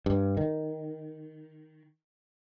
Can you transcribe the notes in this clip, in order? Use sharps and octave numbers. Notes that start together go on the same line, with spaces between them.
G2
D#3